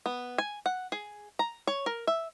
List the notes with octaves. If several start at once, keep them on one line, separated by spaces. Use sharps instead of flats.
B3
G#5
F#5
G#4
A#5
C#5
A#4
E5